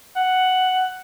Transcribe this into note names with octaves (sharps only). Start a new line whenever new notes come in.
F#5